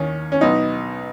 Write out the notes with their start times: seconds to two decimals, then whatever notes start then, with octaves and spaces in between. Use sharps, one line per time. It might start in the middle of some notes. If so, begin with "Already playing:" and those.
Already playing: D#2 D#3 C#4
0.32 C#4
0.41 B1 B2 D#4